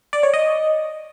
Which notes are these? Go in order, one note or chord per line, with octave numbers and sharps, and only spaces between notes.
D5
C#5
D#5